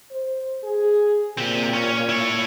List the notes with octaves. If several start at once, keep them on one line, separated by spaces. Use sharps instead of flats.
C5
G#4
A#2 C4 G4
C#4
E4 C#5